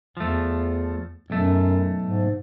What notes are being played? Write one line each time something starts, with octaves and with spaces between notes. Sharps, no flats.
E2 F3 A3
B1 F#2 A3
G#2